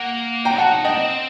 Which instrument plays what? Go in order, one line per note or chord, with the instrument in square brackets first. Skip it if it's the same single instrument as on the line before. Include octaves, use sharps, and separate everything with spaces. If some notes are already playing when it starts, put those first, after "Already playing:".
Already playing: [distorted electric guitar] A#3 [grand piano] F#5
[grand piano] G5 A#5
[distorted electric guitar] F#4 [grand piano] F#5 A5
[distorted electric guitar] D#4
[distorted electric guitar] D4 [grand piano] D#5 G5
[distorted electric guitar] C4